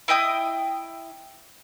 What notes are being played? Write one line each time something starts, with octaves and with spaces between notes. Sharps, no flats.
E4 D#5 G5 D#6